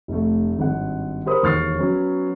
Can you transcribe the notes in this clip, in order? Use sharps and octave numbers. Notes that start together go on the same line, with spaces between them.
F1 A3
G#1 G2 F#5
G4 A#4 C5 B5 D#6
E1 D#2 C#6 F6 A6 C7
F#3 B3 C#4